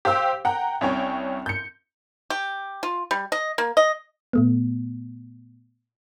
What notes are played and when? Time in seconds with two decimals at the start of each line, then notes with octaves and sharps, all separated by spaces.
0.05 G4 C5 F5 G5 E6
0.45 F#5 G5 A#5
0.81 C2 C#4 C#5 G5
1.46 G6 C#7
2.30 G4
2.83 F4
3.11 G3
3.32 D#5
3.58 A#3
3.77 D#5
4.33 A#2 A3 B3